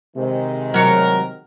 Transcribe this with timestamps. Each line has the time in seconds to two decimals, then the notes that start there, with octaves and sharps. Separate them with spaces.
0.16 C3 D#3 G#3
0.74 F#3 A#4 C#5